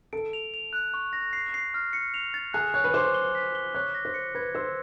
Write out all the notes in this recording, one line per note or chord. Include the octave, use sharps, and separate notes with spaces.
A4 D7
F7
F7
F#6
C#6
A#6
C7
C7
F6
C#7
F7
A6
G#4 F#6
C#5 F#6
B4
C5 D6
G7
B6
G7
C#5 F#6
A#6
C5
C#7
B4 G#6
C5 E6